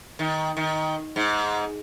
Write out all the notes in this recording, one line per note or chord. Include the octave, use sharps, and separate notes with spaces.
D#3
D#3
G#2